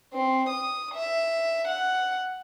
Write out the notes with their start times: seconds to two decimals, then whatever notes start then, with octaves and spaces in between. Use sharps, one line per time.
0.13 C4
0.49 D#6
0.95 E5
1.68 F#5